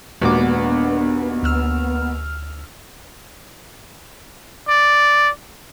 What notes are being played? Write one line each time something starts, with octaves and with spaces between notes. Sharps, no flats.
D#2 A#2 G#3 B3 D4 F#4 D6
D2 E6 F6
D5